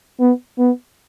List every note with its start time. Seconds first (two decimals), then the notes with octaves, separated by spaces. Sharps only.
0.20 B3
0.59 B3